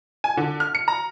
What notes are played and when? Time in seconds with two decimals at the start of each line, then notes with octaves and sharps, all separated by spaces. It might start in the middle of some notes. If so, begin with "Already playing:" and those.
0.24 G#5
0.37 D3
0.60 F6
0.75 C#7
0.88 A#5